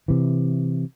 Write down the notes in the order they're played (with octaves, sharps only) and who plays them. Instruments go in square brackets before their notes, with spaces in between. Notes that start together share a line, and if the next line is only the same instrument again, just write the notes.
[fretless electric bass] C3 E3